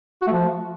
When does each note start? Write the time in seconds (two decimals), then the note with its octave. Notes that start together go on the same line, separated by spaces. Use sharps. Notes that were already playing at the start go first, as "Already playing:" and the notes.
0.22 F#4
0.27 A3
0.32 F3